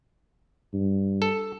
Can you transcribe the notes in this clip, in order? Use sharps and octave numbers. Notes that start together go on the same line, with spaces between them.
G2
A4